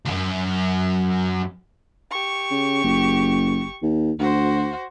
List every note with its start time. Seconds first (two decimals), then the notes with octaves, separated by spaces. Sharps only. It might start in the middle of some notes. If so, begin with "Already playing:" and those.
0.06 C#2 F#2
2.11 G4 C#6
2.51 C#3
2.84 F#1
3.82 D#2
4.19 D2 F#4 C5